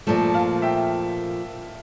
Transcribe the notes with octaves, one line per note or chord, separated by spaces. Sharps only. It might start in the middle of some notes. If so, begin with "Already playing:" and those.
A#2 F3 A3
F5 A5
E5 G5